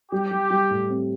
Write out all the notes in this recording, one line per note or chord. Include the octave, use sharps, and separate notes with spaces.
G3 G4
G3
G3
A2
C4